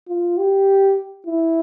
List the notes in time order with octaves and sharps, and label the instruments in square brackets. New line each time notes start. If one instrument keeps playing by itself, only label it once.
[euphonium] F4
G4
E4